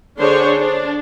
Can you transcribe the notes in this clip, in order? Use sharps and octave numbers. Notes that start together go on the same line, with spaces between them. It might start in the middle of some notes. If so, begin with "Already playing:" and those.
D3 D4 G#4 C5 C#5
D4